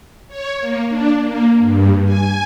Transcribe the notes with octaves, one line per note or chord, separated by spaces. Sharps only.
C#5
A#3
D4
A#3
G2
G#5